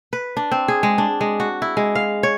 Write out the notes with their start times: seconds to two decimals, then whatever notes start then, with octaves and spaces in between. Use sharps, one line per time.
0.13 B4
0.37 D4
0.51 C4
0.68 G#4
0.83 G#3
0.98 D4
1.21 G#3
1.40 F#4
1.62 E4
1.77 G#3
1.95 F5
2.23 C#5